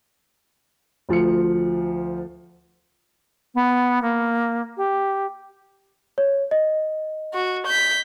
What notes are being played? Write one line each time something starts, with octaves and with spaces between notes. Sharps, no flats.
D2 F3 F4 C#7
B3
A#3
G4
C#5
D#5
F#4
G6 B6